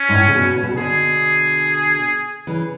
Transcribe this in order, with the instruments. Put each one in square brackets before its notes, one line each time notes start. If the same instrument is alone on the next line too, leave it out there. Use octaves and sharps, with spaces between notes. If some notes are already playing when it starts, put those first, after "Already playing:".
Already playing: [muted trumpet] C#4
[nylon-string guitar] G#2
A2
C#3
B2
C#3
B2
C#3
[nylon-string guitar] B2 D3 [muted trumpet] G#4
[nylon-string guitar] C#3 E3